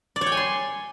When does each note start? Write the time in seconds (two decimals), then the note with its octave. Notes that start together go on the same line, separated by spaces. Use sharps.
0.16 D5
0.21 C#5
0.27 G5
0.32 G#5
0.37 C6